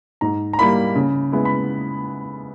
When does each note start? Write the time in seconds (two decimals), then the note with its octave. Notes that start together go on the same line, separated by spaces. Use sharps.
0.21 G#2 A#5
0.53 A#5
0.58 G3 A#3 E4 B5
0.95 C#3
1.32 G#3 B3 E4
1.45 B5